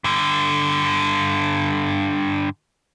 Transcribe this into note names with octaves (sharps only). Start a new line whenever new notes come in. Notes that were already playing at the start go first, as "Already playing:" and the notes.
G2 D3